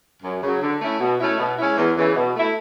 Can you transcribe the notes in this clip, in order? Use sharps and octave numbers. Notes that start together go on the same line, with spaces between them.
F#2
C#3 F#3
D3
A3 C#4 E4
B2
A3 C#4 E4
B2
G#3 C#4 E4
E2
C#3 E3
B2
A3 E4